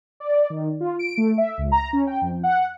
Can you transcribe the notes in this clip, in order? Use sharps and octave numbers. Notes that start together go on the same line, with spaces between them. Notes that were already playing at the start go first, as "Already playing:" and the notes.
D5
D#3
F4
D7
A3
E5
C#2
A#5
C#4
G5
F2
F#5